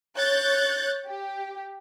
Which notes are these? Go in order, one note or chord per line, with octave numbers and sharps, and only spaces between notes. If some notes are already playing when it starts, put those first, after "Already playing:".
C#5 F#6 G6 A6
G4